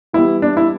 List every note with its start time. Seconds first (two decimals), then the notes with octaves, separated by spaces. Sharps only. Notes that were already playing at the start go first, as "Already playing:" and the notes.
0.13 E3 G3 B3 E4
0.42 D4
0.57 E4